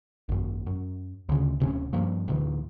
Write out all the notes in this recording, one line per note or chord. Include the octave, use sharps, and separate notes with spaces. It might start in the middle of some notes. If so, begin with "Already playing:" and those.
G#1 F#2
F#2
D2 C#3
D1 C3 G#3 C#4
G2 F3 A#3
A1 D2 A2 E3